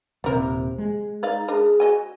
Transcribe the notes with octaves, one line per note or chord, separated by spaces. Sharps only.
D#1 C3 G3 A#4 C5
G#3
D#4 D5 D#5 F5
D4 G#4 A#4 D#5
F#4 D#5 G#5